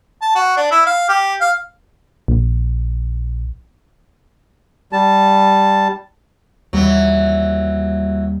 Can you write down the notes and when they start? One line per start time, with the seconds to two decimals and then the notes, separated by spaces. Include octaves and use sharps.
0.22 A5
0.35 F#4
0.57 D4
0.71 E4
0.86 F5
1.09 G4
1.41 F5
2.28 A#1
4.93 G3 A5
6.73 D#2 E3 F#3 G3